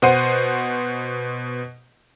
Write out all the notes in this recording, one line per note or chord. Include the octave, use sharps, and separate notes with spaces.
B2 C5 F#5 D#7